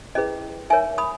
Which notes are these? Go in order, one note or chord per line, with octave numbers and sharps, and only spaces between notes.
C#4 E4 G#4 B4 D#5
D#4 A#4 C#5 E5 G#5
B5 D#6